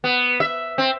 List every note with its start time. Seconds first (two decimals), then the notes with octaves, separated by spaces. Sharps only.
0.04 B3
0.40 E5
0.78 C4